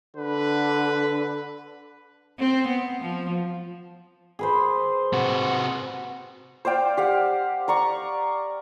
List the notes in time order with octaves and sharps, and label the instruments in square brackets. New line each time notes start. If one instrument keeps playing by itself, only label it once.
[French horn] D3 [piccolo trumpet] B4
[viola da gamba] C4
B3
F3
[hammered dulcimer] G#4 B4 C5
[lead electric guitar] C3 F#4
[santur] C5 D5 F5 G5
G4 F5 F#5
D5 A#5 C#6